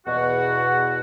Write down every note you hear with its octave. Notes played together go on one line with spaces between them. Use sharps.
E2 B2 F#4 F#5